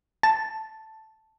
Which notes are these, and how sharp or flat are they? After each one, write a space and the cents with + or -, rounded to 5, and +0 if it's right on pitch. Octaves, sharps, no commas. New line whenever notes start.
A5 +0